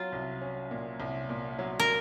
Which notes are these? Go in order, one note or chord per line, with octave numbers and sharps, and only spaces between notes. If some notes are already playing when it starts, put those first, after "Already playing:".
Already playing: F#3 C#4 F4
C2
C#4
A#2
C2
A#2
F#3
A#4